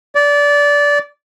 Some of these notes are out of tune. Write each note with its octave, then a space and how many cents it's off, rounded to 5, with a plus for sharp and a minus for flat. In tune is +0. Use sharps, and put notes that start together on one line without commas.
D5 -20